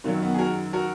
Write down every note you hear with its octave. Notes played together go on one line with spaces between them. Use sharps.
F#2 D#3 F#3 A#3
B3
G#4
F#4 A#4
F#4 A#4